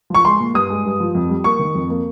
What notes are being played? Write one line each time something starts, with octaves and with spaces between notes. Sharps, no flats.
F3 C#6
G#3 C6
A#2
G2 D#6
G#3
G2
F3
F2
G3
A#3 C#6
D#3
F2
A#3